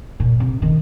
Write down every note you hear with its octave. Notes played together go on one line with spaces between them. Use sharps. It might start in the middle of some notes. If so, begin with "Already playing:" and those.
A#2
C3
D#3